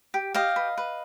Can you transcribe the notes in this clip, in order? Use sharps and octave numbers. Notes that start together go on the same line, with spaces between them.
G4
G4 D#5 F5
B4
B4